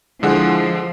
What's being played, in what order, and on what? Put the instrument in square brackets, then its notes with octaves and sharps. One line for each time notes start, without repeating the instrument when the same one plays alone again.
[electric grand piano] D3 G#3 [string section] F3 [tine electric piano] E4 G#4 F#5